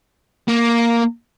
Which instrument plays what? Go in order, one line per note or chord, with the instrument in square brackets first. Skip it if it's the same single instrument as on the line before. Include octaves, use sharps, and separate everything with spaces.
[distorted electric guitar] A#3